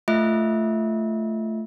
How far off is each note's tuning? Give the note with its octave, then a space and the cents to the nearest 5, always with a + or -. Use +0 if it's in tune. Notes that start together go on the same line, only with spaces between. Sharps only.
A3 +0 F4 -15 E5 -25